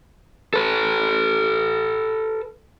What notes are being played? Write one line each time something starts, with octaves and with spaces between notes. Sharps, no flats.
A4 B4